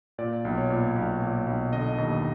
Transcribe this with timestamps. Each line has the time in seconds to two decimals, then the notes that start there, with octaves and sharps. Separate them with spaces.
0.18 A#2 D5
0.45 B1
0.58 C#5
0.70 A#2
0.96 B1
1.22 A#2
1.47 B1
1.73 D3 D#5
1.98 D#2